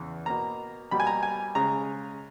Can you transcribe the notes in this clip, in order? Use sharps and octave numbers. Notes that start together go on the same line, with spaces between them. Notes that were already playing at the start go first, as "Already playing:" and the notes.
Already playing: E2 C#3 E3
B2 A#3 A#5
B2 G3 A#3 B5
G#5
A#5
G#5
C#3 G#3 A#5